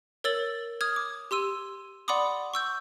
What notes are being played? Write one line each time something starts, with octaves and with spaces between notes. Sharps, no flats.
A#4 C#5 E6 A6 F#7
D#6 F6 G#6
D6
G4 C6 E6 D#7
D5 F#5 B5 C6 D6 D#6
C#6 E6 G6